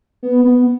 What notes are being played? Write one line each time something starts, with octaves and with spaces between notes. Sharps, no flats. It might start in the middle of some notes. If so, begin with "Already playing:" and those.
B3
B3